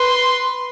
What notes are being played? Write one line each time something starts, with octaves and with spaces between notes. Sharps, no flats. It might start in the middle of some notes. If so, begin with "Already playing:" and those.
Already playing: B4 C6